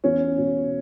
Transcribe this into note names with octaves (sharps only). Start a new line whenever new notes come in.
E2 C#4
B2